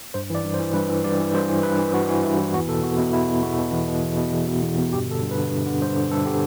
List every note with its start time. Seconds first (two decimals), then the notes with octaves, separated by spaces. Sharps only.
0.14 G2 C5
0.30 E3 D5
0.44 G2
0.54 C5
0.59 E3
0.74 G2 B4
0.90 E3
1.04 G2 D5
1.20 E3
1.34 G2 C5
1.49 E3
1.63 G2 B4
1.79 E3
1.93 G2 F#4
2.08 E3
2.23 G2 E4
2.38 E3
2.54 E2 F#4
2.68 B2 A4
2.83 E2 F#4
2.98 B2 E4
3.12 E2 E4
3.27 B2
3.43 E2 F#4
3.58 B2
3.72 E2
3.88 B2
4.02 E2
4.17 B2
4.32 E2
4.47 B2
4.62 E2
4.78 B2
4.93 G2 G4
5.06 D3 A4
5.22 G2
5.31 B4
5.37 D3
5.51 G2
5.66 D3
5.81 G2 C5
5.96 D3
6.11 G2 A4
6.26 D3 G4